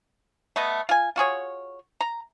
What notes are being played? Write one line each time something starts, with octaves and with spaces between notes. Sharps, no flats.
A3 B3 D#5
F4 G#5
F4 F#4 G#4 C#5
A#5